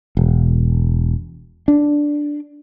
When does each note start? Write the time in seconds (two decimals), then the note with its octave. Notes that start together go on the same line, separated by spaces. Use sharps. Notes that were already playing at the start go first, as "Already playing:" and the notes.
0.17 E1
1.68 D4